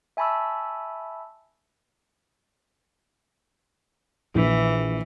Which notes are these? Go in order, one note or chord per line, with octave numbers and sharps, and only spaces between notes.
E5 G#5 A5 B5 C#6 E6
A#1 E3